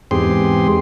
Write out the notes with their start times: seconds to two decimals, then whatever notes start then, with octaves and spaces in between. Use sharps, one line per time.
0.11 E2 G#2 C4 G4 G#4 C6